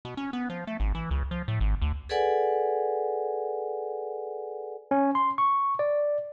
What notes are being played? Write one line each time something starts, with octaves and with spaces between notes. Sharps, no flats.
B2
C#4
B3
F3
A3
G#1
E3
C#2
F3
A2
G#1
D2
G#4 A4 B4 D5 F#5 G#5
C#4
C6
C#6
D5